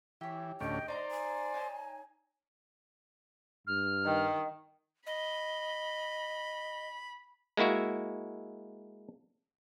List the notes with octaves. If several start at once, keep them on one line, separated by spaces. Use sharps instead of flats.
E3 G4 C#5
D2 A2 C#4 D#5 G5
D#4 C5 D5 A#5 C6
G#5
D#4 C#5 A5
G2 F6
D#3
D#5 B5
G#3 A#3 E4 F#4 E5